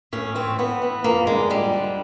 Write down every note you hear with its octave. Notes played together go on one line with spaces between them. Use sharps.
A2 C#4
E3 C4
A2 B3
E3
F2 A#3
D3 G#3
F2 G3
D3